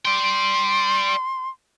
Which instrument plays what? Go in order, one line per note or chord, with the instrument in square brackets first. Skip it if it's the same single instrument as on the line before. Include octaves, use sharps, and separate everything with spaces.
[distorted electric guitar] D5 G5 [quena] C6